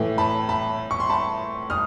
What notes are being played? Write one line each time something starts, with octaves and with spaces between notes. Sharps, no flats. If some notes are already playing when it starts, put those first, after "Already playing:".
Already playing: A2 E3 A3
A5 B5
A5 B5
C#6
C6
A5 B5
D#6 F6